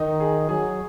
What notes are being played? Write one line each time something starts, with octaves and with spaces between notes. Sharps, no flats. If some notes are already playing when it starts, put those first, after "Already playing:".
Already playing: D#3 D#4
G#4
F#3 G#4